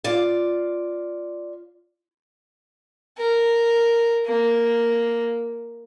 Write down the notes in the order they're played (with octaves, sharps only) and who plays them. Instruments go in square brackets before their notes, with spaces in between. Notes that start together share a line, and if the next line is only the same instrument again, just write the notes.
[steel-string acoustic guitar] F4 D5
[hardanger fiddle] A#4
A#3